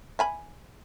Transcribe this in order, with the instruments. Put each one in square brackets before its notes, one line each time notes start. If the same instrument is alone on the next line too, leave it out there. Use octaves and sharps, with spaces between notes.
[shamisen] E5 G#5 B5